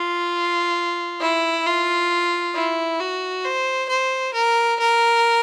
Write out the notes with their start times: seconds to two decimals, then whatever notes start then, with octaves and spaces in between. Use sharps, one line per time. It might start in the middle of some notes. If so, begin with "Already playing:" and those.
Already playing: F4
1.21 E4
1.66 F4
2.55 E4
3.00 F#4
3.45 C5
3.89 C5
4.34 A#4
4.80 A#4